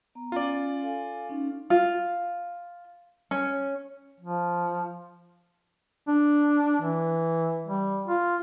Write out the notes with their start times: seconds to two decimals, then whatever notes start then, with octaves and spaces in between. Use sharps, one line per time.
0.15 B3 A#5
0.32 C#4 F4 D5 G#5
0.83 A4 F5 G#5
1.29 C#4 D#4
1.70 F4
3.31 C#4
4.20 F3
6.08 D4
6.81 E3
7.67 G3
8.08 F4